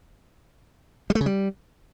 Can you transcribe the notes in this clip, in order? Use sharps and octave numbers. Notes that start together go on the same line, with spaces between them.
G3
A3
C#3
G3